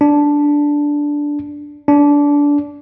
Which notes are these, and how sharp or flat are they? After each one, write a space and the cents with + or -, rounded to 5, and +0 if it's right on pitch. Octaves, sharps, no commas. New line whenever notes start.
D4 -5
D4 -20